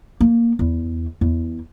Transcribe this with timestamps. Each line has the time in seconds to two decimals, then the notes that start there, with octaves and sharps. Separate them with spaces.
0.21 A#3
0.59 E2
1.21 E2